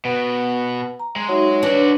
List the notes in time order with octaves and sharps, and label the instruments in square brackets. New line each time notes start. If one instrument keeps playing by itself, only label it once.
[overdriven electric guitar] B2 [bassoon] B3
[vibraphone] A#5
[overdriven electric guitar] G#3
[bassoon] F#3 [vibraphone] D#4 F#4 E5
[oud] D4 [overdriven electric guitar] F#4 D5 [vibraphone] B4 C#5